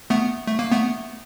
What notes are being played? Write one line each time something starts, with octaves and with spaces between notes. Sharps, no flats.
A3 B3
A3
A#3
A3 B3